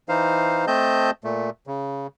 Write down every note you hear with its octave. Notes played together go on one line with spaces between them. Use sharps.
E3 D#4 C5 F5
A3 C4 D#5 A5 G6
A#2 A3
C#3